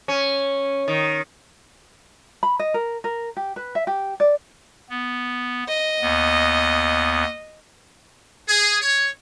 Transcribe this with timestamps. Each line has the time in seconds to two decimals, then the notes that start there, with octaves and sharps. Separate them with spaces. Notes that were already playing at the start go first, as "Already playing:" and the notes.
0.08 C#4
0.88 D#3
2.43 B5
2.59 D#5
2.74 A#4
3.04 A#4
3.37 G4
3.56 B4
3.75 E5
3.87 G4
4.20 D5
4.90 B3
5.68 D#5
6.02 D#2 B3
8.47 G#4
8.81 C#5